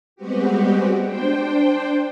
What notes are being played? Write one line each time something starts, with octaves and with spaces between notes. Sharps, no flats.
G3 G#3 B3 C4 F#4 G4
D4 C5 G5